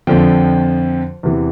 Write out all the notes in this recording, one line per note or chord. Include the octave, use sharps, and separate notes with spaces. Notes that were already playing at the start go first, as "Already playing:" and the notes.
F2 D3 F3 G5
E2 C3 E3